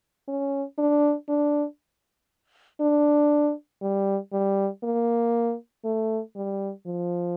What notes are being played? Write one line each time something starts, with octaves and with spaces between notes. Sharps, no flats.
C#4
D4
D4
D4
G3
G3
A#3
A3
G3
F3